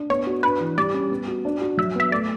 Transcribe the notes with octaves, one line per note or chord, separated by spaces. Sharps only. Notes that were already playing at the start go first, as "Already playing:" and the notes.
Already playing: D4
B3 C#5
F#4
D4 B4
E3
G3 D5
C#4
B3
F#4
D4
F#4
F#3 E5
B3 E5
A3 D5